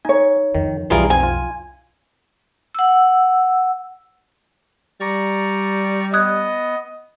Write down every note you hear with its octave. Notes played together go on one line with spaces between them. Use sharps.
D#4 C#5 G#5
F2 D#3
B1 F2 E3 G3 F4 G#4 A#4
C4 G#5
F4
F#5 E6
G3 D5 A#5 C#6
B3 D#5 D#6 F#6 G#6